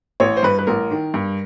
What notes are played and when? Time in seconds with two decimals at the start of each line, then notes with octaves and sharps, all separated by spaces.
0.20 A1 C#5
0.37 C5
0.43 G2 B4
0.59 B4
0.67 A1 A#4
0.91 D#3
1.14 G2